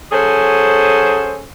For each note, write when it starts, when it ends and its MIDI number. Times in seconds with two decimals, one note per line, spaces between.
0.12 1.44 54
0.12 1.44 61
0.12 1.44 68
0.12 1.44 69
0.12 1.44 72